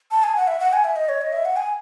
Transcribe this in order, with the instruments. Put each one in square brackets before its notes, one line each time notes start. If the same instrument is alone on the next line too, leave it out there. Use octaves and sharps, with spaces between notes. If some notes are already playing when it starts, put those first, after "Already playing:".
[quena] A5
G#5
F#5
E5
F#5
G#5
E5
D#5
C#5
D#5
E5
F#5
G#5